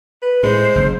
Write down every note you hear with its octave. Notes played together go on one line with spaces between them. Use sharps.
B4
A2 G#3 C5
F#1